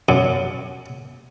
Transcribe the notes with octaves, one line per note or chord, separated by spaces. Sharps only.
F#2